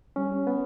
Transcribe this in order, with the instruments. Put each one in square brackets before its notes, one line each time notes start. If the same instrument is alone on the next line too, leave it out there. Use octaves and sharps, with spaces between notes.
[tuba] G3 [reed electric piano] C#4
[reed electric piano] B3